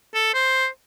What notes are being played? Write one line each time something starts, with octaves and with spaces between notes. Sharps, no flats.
A4
C5